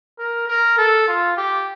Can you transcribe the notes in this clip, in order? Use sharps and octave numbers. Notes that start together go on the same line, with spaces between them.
A#4
A#4
A4
F4
G4